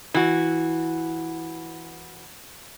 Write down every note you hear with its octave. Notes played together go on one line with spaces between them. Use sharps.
E3 F#4